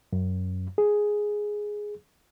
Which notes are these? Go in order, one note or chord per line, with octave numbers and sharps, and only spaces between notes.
F#2
G#4